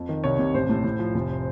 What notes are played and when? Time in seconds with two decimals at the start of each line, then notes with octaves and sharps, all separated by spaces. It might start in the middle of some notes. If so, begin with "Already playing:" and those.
Already playing: F2
0.09 D#3
0.24 C2 C#5
0.39 C3
0.54 A1 C5
0.69 A2
0.84 A2
0.99 F3
1.14 F1